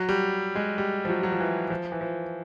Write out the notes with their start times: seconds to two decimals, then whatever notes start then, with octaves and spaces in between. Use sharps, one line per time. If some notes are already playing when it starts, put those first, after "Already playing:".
Already playing: F#3
0.09 G3
0.55 G#3
0.78 G3
1.05 F3
1.09 F#3
1.23 F#3
1.32 F3
1.40 E3
1.70 F3
1.92 E3
2.01 F3